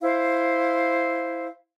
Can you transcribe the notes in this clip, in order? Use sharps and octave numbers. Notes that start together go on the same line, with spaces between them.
E4 C5 F5